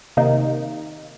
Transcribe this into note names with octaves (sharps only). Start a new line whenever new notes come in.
C3 D#3 A#3 D#4